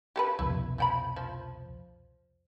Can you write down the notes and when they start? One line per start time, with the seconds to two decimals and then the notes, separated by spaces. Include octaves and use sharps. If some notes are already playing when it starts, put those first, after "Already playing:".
0.16 G4 A4 B4
0.39 C2 F2 B2 E4
0.78 F3 G5 B5
1.16 F3